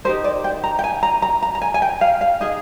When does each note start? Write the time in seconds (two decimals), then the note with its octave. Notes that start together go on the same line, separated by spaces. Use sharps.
0.05 D#4 G4 A#4 C5
0.24 D5
0.44 G5
0.64 A#5
0.79 G5
0.84 G#5
1.03 A#5
1.22 A#5
1.42 A#5
1.55 A#5
1.62 G#5
1.74 G#5
1.82 G5
2.01 F5
2.21 F5
2.40 D#4 G#4 D#5